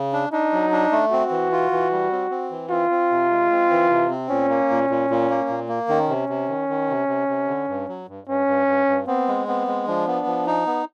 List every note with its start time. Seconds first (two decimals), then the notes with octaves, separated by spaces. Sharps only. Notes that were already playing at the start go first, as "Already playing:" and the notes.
Already playing: C#3
0.13 D4
0.33 D4 D#4
0.53 F#3
0.72 D4
0.92 A3
1.11 C4 F#4
1.31 E3
1.52 F4
1.72 E3
1.92 G3
2.12 C4
2.31 C4
2.51 E3
2.70 C4 F4
2.90 C4
3.11 C3
3.31 G#3
3.51 C4
3.70 E3
3.90 C3
4.10 C4
4.30 A#2 C#4
4.49 A#3
4.70 A#2
4.90 A#2
5.10 A#2
5.30 A#3
5.49 A#2
5.69 A#3
5.89 D#3 C#4
6.09 C3
6.29 C3
6.48 D#3
6.69 D#3
6.89 C3
7.08 C3
7.28 C3
7.48 D3
7.68 G2
7.88 F#3
8.08 G2
8.27 G2 C#4
8.47 G2
8.67 G2
8.87 G2
9.07 B3 C4
9.28 G#3
9.47 B3 C4
9.67 G#3
9.87 F3 D4
10.07 B3
10.26 F3
10.47 D#4
10.66 B3